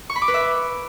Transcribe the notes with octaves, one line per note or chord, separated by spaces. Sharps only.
C#6
B5
D6
B4
E5